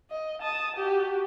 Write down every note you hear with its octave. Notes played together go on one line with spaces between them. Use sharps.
D#5
A5 D#6
F#4 G4